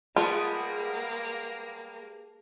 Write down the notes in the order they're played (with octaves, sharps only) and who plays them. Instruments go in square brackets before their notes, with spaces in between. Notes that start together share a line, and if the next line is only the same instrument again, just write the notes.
[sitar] G3 G#3 B3 [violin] A#3 [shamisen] F4 [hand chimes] G#4 A5